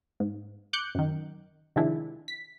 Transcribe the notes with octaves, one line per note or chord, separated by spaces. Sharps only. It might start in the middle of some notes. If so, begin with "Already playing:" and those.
G#2
D6 F#6 G6 C#7
F#2 D#3
C3 D#3 F3 G#3 D4 E4
B6